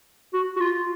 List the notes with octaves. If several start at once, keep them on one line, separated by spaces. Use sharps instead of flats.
F#4
F#4
F4